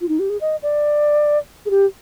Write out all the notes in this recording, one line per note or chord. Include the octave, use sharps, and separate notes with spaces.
F4
D#4
G4
G#4
D#5
D5
G#4
G4